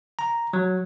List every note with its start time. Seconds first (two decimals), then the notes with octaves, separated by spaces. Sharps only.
0.19 A#5
0.53 F#3